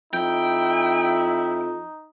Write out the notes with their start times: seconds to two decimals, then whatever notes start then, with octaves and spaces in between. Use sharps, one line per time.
0.13 F2 D#4 E4 G5